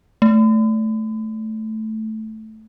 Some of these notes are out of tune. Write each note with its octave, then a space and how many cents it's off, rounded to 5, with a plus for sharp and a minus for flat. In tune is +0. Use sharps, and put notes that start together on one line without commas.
A3 -5